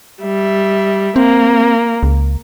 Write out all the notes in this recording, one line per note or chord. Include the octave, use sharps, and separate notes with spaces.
G3 E5
A#3 C4
C#2